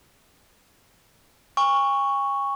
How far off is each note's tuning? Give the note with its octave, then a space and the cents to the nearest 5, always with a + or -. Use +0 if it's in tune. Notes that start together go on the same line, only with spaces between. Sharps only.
G#5 -45 C#6 +0